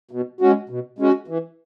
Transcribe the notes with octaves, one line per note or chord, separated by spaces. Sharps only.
B2
G#3 C#4 F#4
B2
G#3 C#4 F#4
E3